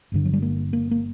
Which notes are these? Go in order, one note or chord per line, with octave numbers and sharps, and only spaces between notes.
G1 G2 D3
F#3
G3
A#3
A#3
A#3